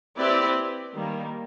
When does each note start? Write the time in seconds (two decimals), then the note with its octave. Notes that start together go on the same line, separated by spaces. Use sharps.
0.17 C4 E4 G4 B4 D5
0.94 D#3 G3 A#3